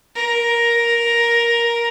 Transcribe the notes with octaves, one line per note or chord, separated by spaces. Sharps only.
A#4